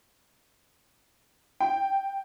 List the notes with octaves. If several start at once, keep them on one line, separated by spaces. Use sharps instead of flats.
G5